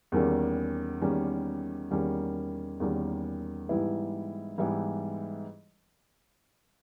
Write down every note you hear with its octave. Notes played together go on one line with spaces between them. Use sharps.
E2 D#3 G3 A#3 C#4
E2 D#3 G3 A#3 C#4
E2 D#3 G3 A#3 C#4
E2 D#3 G3 A#3 C#4
G#2 E3 G3 B3 E4
G#2 E3 G3 B3 E4